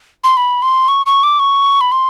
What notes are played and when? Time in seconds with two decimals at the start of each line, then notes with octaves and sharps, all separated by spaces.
0.24 C6
0.37 B5
0.62 C6
0.88 C#6
1.06 C#6
1.23 D6
1.39 C#6
1.81 B5
1.92 C6